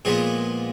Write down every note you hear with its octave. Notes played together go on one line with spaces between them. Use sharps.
A#2 F3 G#3 B3 G#4